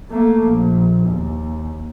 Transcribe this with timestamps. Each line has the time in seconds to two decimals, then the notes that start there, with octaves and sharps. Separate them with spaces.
0.11 A3 A#3
0.49 A#1
1.09 D#2